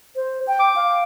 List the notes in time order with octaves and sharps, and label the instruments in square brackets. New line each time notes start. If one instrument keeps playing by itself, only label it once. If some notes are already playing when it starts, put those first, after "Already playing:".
[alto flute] C5
G5
[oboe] D6
[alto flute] F5